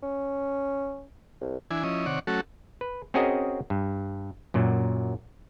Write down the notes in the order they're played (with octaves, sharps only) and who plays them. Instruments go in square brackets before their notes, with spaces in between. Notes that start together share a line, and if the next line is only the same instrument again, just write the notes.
[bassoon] C#4
C2
[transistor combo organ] E3 D4 E4 G#5
F3 C#4 E4 D#5
C3 D#3 C#5 D5 F#5
F#3 A3 C#4 F#4 A4
[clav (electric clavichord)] B4
C4 C#4 F#4 G#4 A#4 D#5
G2
F#2 A#2 F#3